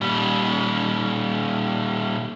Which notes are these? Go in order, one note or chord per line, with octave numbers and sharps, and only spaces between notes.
A#2 G3